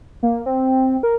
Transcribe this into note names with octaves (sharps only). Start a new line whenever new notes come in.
A#3
C4
A#4